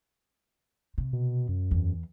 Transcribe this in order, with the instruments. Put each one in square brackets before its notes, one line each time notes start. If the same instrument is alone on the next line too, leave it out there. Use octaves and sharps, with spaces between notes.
[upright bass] C3
[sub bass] B2
F#2
[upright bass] E2